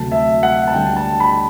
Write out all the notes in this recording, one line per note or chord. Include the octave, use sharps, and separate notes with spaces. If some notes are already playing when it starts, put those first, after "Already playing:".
Already playing: D2 C3 F#3 A3 A5
E5
F#5
A5
D2 D3 G3 G5
A5
B5